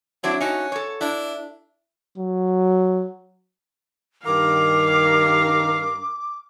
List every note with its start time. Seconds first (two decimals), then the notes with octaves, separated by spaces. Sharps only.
0.24 F#3 C4 D4 E4
0.40 C#4 D#4 F#4
0.72 A4 C#5
1.01 D4 E4
2.18 F#3
4.26 G2 D#3 A#4 F5 D6